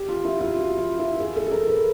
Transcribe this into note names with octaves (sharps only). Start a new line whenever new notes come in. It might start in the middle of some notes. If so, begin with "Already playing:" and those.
Already playing: G4
F4
E4
F4
F#4
F4
E4
G#4
A4
A4
A#4
B4